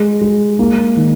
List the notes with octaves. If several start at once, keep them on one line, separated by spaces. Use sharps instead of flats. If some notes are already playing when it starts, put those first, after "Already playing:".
Already playing: G#3
G#3
A#3
D#3